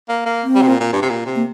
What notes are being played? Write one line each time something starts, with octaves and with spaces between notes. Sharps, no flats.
A#3
A#3
C4
G3
C3
A#2
A#2
G2
C3
A#2
C3
A#3